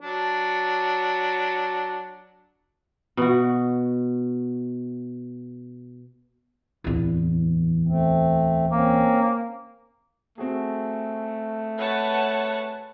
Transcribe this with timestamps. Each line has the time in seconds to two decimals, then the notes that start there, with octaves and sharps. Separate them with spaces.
0.01 F#3 D4
3.17 B2 F#4
6.84 D1 E2
7.87 A3 C4
8.72 A#3 C4 C#4
10.38 A3 C4 F#4 G#4
11.78 B4 C#5 F#5 A5